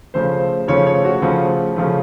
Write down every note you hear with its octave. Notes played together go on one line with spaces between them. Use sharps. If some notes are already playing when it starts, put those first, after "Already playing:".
C#3 F3 A3 C5
C#3 F3 A3 C#5
C#5
F#4
C#3 F3 A3
C#3 F3 A3